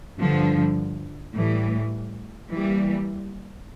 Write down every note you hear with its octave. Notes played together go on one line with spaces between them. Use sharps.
G2 D3 F3
A2 E3 G3
E3 G3 A#3